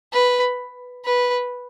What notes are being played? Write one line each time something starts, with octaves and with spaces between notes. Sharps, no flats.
B4
B4